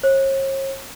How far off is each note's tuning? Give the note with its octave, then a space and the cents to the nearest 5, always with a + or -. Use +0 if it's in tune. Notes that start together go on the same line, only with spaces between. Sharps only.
C#5 -45